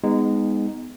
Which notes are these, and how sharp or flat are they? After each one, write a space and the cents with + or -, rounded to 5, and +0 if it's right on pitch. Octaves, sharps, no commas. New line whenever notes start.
G#3 -20 B3 +15 D#4 +0